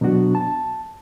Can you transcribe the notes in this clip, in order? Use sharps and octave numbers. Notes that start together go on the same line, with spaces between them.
B2 F#3 B3 D4 F#4
A5